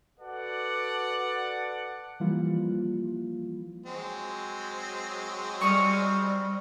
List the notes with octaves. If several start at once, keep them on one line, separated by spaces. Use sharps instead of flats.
F#4 A4 B4 D5 F#5
E3 F3 G3 A#3 E4 F4
F#3 G#3 C4
G3 C#6 D#6 F6